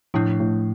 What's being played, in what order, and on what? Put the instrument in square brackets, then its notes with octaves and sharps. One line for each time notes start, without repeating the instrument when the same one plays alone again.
[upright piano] A2 [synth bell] F3 A3 D4
[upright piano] A2